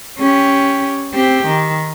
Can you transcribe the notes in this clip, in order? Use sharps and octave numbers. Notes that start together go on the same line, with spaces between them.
C#4 G4
C4 G4
D#3